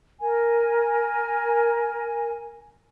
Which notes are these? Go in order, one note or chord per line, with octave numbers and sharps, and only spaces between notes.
A#4 G#5